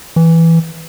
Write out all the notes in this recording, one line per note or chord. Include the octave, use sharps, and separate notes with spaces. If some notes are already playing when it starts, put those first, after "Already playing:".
E3